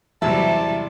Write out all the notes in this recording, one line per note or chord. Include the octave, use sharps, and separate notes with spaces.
E2 C3 F#3 G3 E4 E5 A5